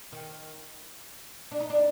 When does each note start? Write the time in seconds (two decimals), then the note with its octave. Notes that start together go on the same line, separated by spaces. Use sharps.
0.12 D#3
1.51 D4
1.60 D#4
1.70 D4